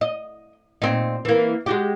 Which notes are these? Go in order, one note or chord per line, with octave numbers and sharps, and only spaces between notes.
D#5
A#2 C4 D#4
E3 A#3
G#3 F#4 G4